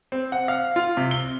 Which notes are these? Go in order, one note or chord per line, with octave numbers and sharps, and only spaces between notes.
C4
F#5
F5
F4
C3
G7